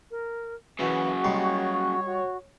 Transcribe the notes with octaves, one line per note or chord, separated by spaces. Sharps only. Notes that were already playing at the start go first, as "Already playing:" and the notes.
A#4
F#2 C#3 E3 E4 F#4
G3 D#4 C#5 C6
F#4